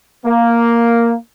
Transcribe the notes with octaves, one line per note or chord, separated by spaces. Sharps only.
A#3